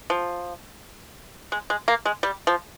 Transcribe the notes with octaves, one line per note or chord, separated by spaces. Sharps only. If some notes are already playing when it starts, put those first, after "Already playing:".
F3
G#3
G#3
A#3
G#3
G3
F3